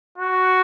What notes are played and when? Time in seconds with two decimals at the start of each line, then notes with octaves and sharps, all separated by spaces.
0.18 F#4